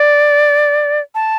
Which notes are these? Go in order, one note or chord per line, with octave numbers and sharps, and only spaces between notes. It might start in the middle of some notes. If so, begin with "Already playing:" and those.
Already playing: D5
A5